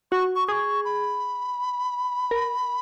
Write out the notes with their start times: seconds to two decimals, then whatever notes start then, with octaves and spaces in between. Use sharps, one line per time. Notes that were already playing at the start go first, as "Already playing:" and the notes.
0.12 F#4 C#6
0.36 C#6
0.48 G#4 C#6 D#6
0.85 B5
2.31 A#4